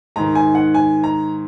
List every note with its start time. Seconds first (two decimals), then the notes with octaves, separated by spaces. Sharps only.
0.16 G#2 D#3 A#5
0.35 G#5
0.55 F#5
0.74 G#5
1.04 A#5